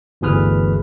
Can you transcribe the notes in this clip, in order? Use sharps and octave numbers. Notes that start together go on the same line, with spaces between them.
G1 D2 E3 G#4 B4 F6